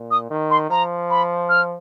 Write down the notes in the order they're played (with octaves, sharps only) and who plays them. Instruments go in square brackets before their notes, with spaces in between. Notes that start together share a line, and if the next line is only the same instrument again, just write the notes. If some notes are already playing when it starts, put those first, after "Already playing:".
Already playing: [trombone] A#2
[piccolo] D#6
[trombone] D#3
[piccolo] C6
[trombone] F3 [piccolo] A#5
[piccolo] B5
F6